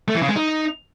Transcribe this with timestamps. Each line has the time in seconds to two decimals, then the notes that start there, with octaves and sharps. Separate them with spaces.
0.08 A3
0.15 E3
0.22 C#3
0.29 G#3
0.36 D#4